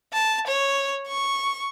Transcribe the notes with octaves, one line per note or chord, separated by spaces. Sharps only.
A5
C#5
C#6